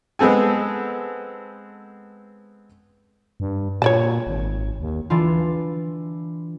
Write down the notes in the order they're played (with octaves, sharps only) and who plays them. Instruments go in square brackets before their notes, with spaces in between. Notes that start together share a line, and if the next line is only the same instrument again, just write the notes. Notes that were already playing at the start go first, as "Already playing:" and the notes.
[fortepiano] G#3 B3 C4 A4 G#5
[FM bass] G2
[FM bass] A#2 [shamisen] C#5 D5 A5
[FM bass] G#1
D#2
[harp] E3 D4 F4